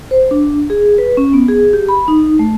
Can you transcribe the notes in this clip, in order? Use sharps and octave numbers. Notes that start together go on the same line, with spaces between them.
C5
D4
G#4
B4
C#4
B3
G#4
G4
B5
D#4
A3